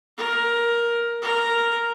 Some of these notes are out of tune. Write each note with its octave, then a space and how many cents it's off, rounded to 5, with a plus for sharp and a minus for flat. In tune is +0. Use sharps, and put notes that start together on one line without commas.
A#4 +10
A#4 +0